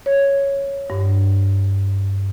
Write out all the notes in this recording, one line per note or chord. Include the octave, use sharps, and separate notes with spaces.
C#5
G2